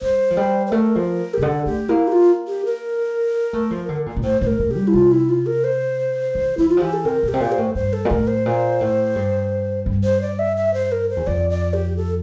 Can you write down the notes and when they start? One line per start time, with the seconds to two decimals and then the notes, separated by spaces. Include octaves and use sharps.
0.01 G3 C5
0.31 F3
0.37 G3
0.67 C5
0.71 A3 A#4
0.95 F3
1.34 G4
1.38 C3
1.42 D3 A4
1.66 A3 G4
1.89 A#3 E4
2.08 G4
2.12 F4
2.47 G4
2.65 A#4
3.53 A3
3.71 F3
3.89 D3
4.06 A#2
4.16 A#2
4.23 A2 C5
4.41 A2 C5
4.47 A#4
4.59 A2
4.71 G4
4.76 G3
4.88 E4
4.94 C3 F4
5.12 E4
5.29 F4
5.46 A#4
5.64 C5
6.35 E3
6.58 E3 E4
6.69 F4
6.77 F3
6.81 E3 G4
6.93 A4
7.05 C3 A#4
7.23 A#2
7.28 G4
7.34 C3
7.40 A#2
7.52 C5
7.58 A2
7.75 G2 C5
7.93 A4
8.05 A#2
8.10 A2 A#4
8.27 C5
8.46 A#2
8.81 A2
9.16 G2
9.86 G2
10.03 C5
10.22 D5
10.39 E5
10.57 E5
10.74 C5
10.92 A#4
11.09 C5
11.17 E2
11.27 F2 D5
11.50 D5
11.74 G4
11.97 A4